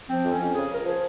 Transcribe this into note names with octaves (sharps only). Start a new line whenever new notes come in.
F3 C4
F2
C#4
F2
C#3 G#4
C#2 A#4
F3 G#4